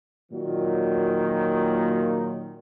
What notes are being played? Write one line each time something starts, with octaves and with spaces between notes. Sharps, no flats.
A#2 D#3 F#3